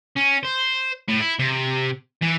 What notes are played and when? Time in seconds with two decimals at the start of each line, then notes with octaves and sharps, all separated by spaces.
0.17 C#4
0.45 C5
1.08 A2
1.20 E4
1.39 C3
2.22 E3